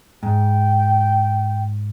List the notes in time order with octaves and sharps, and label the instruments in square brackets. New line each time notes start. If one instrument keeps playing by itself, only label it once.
[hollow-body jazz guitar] G#2 [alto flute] G5